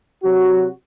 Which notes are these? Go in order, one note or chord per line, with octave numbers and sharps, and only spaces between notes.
C3 F#3 F#4